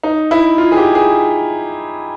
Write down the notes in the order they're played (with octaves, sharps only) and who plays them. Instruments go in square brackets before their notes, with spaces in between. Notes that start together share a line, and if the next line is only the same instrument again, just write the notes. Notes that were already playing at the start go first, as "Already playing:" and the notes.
[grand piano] D#4
E4
F4
G#4
G4
G#4